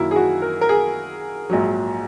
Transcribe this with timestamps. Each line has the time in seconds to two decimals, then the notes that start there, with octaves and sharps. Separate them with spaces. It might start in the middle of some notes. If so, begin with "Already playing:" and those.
Already playing: F#2 D#3 F#3 A#3 E4
0.11 G#4
0.16 F#4
0.42 A#4
0.61 A#4
0.69 G#4
1.50 A#1 G#2 F#3